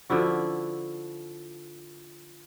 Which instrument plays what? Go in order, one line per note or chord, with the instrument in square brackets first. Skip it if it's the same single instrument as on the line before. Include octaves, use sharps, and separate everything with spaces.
[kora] D3 F3 E4 F#4